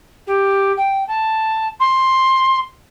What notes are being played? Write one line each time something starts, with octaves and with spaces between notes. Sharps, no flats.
G4
G5
A5
C6